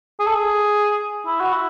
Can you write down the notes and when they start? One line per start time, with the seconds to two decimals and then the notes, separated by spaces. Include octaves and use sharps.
0.19 G#4
0.27 A4
0.35 G#4
1.26 E4
1.40 F#4
1.53 E4